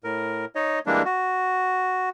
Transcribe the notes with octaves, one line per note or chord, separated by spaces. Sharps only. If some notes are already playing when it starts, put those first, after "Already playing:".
A2 A#4
D#4 C#5 D#5
E3 G3 G#3 A#3 D4
F#4